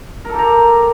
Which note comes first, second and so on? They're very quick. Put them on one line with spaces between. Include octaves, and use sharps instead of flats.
A#4 A4 G4 A#5